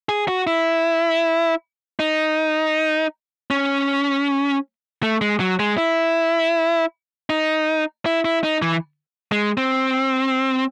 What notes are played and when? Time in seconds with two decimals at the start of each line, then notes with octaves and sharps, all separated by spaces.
0.09 G#4
0.28 F#4
0.47 E4
2.00 D#4
3.51 C#4
5.03 A3
5.21 G#3
5.40 F#3
5.60 G#3
5.78 E4
7.30 D#4
8.06 E4
8.25 E4
8.44 D#4
8.62 E3
9.32 G#3
9.58 C4